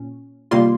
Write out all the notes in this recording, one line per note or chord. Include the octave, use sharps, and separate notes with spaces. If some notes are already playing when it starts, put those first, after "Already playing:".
Already playing: A#2 C#4
C3 D#3 G3 A#3 F4 C6